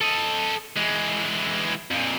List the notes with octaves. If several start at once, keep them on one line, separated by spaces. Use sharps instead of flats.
A4 D#5
E3 G#3
F2 A#2